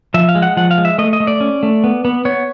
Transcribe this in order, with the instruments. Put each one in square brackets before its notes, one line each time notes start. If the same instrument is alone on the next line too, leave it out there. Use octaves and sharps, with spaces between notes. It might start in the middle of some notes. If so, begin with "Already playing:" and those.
[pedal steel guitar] F3 E5
F5
G#3
F#5
F3 F#5
F5
G#3
E5
A3 D#5
D#5
A3
D5
C#4
A3
B3
B3
B3 C#5